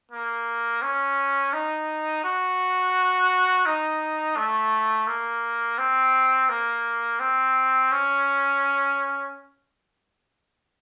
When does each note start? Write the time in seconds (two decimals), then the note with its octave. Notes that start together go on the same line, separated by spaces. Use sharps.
0.11 A#3
0.82 C#4
1.53 D#4
2.24 F#4
3.66 D#4
4.37 A3
5.07 A#3
5.78 C4
6.49 A#3
7.20 C4
7.92 C#4